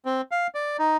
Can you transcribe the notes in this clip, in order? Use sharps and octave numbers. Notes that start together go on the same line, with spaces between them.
C4
F5
D5
D#4